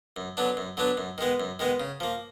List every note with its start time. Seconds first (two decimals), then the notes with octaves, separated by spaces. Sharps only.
0.16 F#2
0.37 D3 F#3 B3 D4
0.57 F#2
0.77 D3 F#3 B3 D4
0.97 F#2
1.18 D#3 G#3 B3
1.40 F#2
1.59 D#3 G#3 B3
1.80 C#3
2.00 F3 A#3